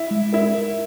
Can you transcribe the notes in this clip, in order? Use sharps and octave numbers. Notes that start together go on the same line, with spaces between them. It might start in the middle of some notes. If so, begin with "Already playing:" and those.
Already playing: E4
G#3
E4 A#4
A#4